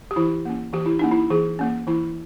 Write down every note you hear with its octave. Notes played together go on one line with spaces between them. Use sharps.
G4
E3 E4
A#3 C#4
E3 G4
E4
A#3 C#4 D#4
E4
E3 G#4
A#3 C#4
E3 E4